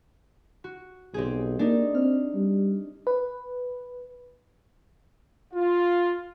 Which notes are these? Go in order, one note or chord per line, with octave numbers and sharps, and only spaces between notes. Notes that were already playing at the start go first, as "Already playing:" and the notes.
F#4
B1 C4 G4 G#4
A#3 D4 D#4
C4 F6
G3
B4
F4